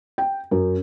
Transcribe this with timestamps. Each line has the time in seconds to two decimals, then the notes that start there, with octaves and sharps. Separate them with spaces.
0.18 G5
0.51 F#2